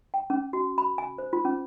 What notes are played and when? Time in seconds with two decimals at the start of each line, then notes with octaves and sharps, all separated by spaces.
0.14 G5
0.30 C#4
0.53 F#4
0.78 B5
0.98 G#5
1.18 C5
1.33 F4
1.45 C#4